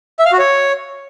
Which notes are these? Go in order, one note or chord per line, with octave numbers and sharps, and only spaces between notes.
E5
F5
F#4
C#5